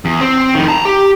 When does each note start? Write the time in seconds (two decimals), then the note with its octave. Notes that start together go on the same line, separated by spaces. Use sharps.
0.05 E2
0.21 C4
0.54 F2 D#3
0.68 A5 A#5
0.85 G4